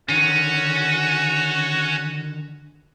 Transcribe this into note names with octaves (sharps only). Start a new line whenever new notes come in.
D3 D#3 C#4 F#4